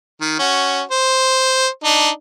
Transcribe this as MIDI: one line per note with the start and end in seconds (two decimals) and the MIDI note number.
0.21 0.36 51
0.39 0.81 61
0.39 0.81 66
0.91 1.67 72
1.84 2.09 62
1.84 2.09 63